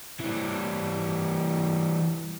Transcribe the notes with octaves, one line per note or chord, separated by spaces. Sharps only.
E3 G3